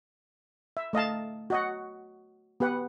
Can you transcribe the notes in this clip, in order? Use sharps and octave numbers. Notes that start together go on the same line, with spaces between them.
E5
A3 D#5 F5 A5
F#4 D#5 F#5
B3 G4 B4 F#5